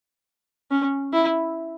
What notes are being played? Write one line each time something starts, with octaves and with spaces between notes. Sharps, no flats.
C#4
E4